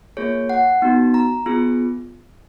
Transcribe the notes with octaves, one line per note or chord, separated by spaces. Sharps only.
A#3 F4 G#4 C#5
F#5
B3 D#4 F#4
A#5
B3 F4 G#4